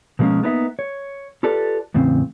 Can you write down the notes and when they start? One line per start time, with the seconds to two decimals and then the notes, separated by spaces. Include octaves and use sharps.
0.19 B2 F3 G#3 A#3 C#4
0.43 A#3 B3 D#4 A#4 E5
0.79 C#5
1.43 F4 G4 A4 B4 D5
1.94 E2 A2 C#3 C4